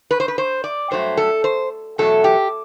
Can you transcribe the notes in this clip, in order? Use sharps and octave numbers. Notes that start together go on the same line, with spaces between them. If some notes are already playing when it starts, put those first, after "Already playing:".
B4
C5
B4
C5
D5
G2 F#3 A3 C5
A4
C5
E2 B2 F#3 A3 A4
G4